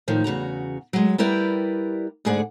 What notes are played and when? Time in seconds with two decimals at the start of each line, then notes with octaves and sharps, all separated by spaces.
0.08 A2 D#3 F3
0.24 E2 C#3 F#4 A#5
0.93 F#3 G#3
1.18 G3 E4 G4 A#4 B4 D5
2.25 D2 G#2 D3 G#4 D5 F#5